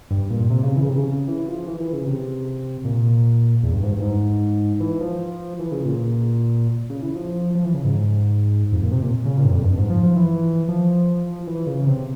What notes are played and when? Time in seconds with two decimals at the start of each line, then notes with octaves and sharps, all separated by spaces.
0.11 G2
0.30 A#2
0.50 C3
0.63 C#3
0.76 E3
0.83 C#3
0.90 C3
0.98 C#3
1.28 E3
1.48 F3
1.68 E3
1.80 E3
1.93 C#3
2.07 C3
2.85 A#2
3.63 E2
3.73 G2
3.83 G#2
3.92 G2
4.02 G#2
4.80 E3
5.01 F3
5.60 E3
5.72 C#3
5.85 A#2
6.90 C#3
7.02 E3
7.15 F3
7.55 F3
7.65 E3
7.74 C#3
7.84 G#2
8.72 F2
8.83 A#2
8.92 C3
9.02 A#2
9.25 C#3
9.38 A#2
9.45 G2
9.51 F2
9.64 G2
9.77 G#2
9.90 F3
10.03 F3
10.16 E3
10.69 F3
11.47 E3
11.67 C#3
11.86 C3